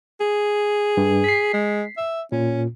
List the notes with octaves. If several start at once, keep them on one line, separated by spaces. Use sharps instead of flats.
G#4
G2
B6 C7
G#3
E5
A#2 C#4